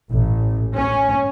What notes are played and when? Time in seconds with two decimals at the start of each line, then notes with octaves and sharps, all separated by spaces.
0.11 A1
0.76 C#4